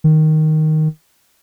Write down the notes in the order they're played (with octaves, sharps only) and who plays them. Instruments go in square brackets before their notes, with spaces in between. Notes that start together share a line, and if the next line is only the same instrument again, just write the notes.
[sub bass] D#3